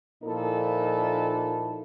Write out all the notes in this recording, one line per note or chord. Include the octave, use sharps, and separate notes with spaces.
A#2 F3 A#3 D#4 E4 A4